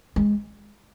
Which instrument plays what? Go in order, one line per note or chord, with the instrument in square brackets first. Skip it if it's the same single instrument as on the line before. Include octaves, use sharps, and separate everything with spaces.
[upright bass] G#3